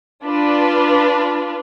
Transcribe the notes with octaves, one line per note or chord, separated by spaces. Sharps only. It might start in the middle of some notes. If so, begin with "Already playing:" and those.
D4 F4 B4